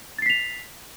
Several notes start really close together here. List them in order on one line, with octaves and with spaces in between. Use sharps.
A6 C7 B6 F7